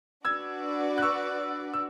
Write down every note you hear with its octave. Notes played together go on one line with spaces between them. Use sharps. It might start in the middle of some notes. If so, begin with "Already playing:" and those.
D4 F#4 B4 D5 E6 G#6
F#6
C#6 E6
E6